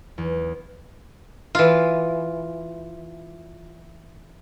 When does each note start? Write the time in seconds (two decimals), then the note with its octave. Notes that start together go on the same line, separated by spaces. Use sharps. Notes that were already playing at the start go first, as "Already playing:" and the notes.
0.18 E2
1.55 E3 F4